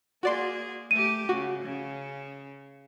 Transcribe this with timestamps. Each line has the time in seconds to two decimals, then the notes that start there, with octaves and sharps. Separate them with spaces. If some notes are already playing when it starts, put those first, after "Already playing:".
0.23 A#3 F#4 G#4 D5 C6
0.91 A3 G4 D#7
1.29 C#3 F#4
1.64 C#3